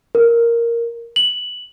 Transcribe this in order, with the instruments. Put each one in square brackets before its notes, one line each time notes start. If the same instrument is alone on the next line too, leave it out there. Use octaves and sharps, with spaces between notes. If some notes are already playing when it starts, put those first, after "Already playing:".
[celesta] A#4
F#7